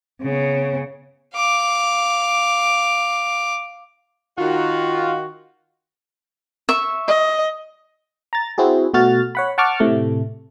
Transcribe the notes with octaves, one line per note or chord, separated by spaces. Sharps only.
C#3 B3
F5 D6
D#3 F4 F#4
E5 C#6
D#5
A#5 A6
C4 E4 F#4 G#4
B2 A3 F#4 F6 A6
C#5 F#5 B5
F#5 A5 C#6 D6 F6
A2 C3 A3